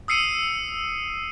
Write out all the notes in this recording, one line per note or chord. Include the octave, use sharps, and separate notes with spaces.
D#6 E6 C7 C#7 D#7